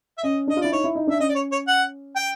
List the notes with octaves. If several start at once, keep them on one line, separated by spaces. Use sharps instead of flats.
E5
C#4 D#5
D4 D#5
F4
E4 D5
D#4 C#5
E4
D#4
D4 E5
C#4 D#5
D5
C#5
C#5
F#5
G5